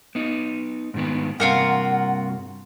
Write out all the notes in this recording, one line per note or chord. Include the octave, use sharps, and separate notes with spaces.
B3 D#4
G#2 D#3 B3
G2 C3 F4 F#4 A#4 F#5